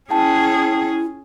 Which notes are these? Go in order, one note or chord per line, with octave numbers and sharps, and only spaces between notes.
C#4 E4 G#4 G5 A5